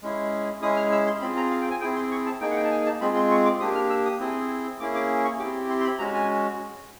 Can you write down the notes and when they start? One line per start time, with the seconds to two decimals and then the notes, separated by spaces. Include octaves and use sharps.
0.02 G#3 C#4 E4 G#4
0.62 G#3 C#4 E4 G#4 D#6
0.76 F6
0.92 E6
1.07 C6
1.21 C4 F4 G#4 B5
1.37 A#5
1.51 F5
1.61 G5
1.71 G#5
1.81 C4 E4 G#4 G5
1.96 C6
2.11 C#6
2.26 A5
2.41 A#3 D#4 G#4 G5
2.51 F#5
2.56 G5
2.65 A5
2.71 G#5
2.86 A5
3.01 G#3 C4 F4 G#4 B5
3.16 C6
3.31 C#6
3.45 D6
3.60 A#3 D4 G4 D#6
3.75 F6
3.90 E6
4.06 D#6
4.20 C4 E4 G#4
4.80 A#3 C#4 E4 G#4 D6
4.95 D6
5.24 C#6
5.39 C4 E4 G4 D6
5.69 C6
5.80 C6
5.84 B5
5.99 G#3 C#4 F#4 A#5
6.14 G#5